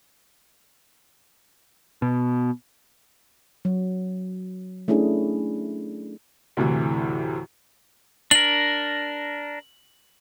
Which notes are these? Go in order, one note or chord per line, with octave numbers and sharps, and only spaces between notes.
B2
F#3
A3 C#4 D4 E4 G#4
D2 A2 C3 E3
D4 A#4 F#7